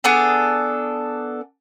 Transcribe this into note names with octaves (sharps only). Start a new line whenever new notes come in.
B3 D4 G#4 A4